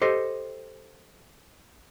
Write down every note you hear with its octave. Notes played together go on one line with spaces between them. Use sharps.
G4 A4 C5 D#5